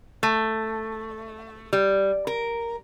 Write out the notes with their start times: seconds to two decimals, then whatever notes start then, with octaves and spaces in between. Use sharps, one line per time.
0.23 A3
1.73 G3
2.27 A#4